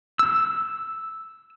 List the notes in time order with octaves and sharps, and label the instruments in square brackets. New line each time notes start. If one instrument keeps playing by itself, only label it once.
[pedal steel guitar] E6